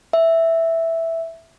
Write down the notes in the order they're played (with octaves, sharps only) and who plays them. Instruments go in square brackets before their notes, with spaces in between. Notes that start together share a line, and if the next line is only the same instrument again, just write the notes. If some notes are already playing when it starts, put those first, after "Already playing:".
[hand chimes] E5